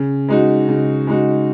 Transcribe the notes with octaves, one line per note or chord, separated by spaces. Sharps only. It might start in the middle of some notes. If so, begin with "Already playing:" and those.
Already playing: C#3
G#3 D#4 F#4
C#3
G#3 D#4 F#4